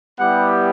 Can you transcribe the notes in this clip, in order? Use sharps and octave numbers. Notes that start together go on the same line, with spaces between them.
G3 B3 E4 G4 F#5